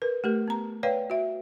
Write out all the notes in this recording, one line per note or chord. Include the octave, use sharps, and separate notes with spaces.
A#4 B4
A3 G4 A#4
B3 A#5
B4 C#5 D5 F5 G5
F#4 E5